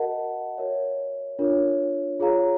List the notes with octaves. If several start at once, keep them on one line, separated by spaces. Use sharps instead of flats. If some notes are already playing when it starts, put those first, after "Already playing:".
Already playing: F#4 A#4 D#5 F#5 A5
F#4 A#4 C#5 E5
D4 F4 A#4 C#5
F4 G#4 C#5 F5 A#5